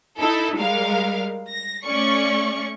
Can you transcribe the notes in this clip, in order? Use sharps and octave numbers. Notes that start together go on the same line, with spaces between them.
D#4 E4 A4
G3 G#3 A#4 F5
A#6
A3 C#4 D5 C#6 C#7